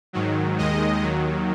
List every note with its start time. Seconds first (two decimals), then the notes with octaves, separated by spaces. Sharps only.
0.13 G#2 D#3 F#3
0.58 D#2 D#3 G#3 D#5
1.02 D#2 D#3 F#3